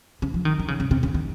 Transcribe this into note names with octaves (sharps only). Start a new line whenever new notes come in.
C#3
F3
D#3
D#3
C#3
C#3
C3
C#3
D#3